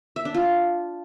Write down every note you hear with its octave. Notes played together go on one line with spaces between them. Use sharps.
E5
D4
F4